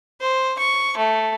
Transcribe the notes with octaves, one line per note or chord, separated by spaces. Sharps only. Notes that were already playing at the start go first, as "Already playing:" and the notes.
C5
C#6
A3